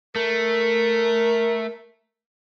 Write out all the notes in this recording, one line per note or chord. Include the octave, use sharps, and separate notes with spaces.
A3 A#4